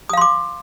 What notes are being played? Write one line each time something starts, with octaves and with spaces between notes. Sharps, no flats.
F5 C6 D6 D#6